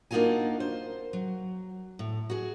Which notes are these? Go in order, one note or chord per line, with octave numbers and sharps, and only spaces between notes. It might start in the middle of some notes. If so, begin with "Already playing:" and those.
A#3 D4 D#4 F4 F#4 G#5
C5
F#3
A2
F#4 G#4